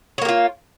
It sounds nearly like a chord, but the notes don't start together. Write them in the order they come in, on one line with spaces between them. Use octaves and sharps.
C#5 A#3 G4 F4